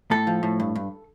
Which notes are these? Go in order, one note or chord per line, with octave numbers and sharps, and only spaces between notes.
A2 A4
F3
A2
G2
G2